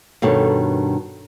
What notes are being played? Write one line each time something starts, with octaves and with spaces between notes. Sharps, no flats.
G2 B2 D#3 D4 A4 C#5